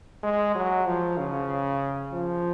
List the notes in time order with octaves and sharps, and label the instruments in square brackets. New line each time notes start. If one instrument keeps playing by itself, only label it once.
[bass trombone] G#3
F#3
F3
C#3
F3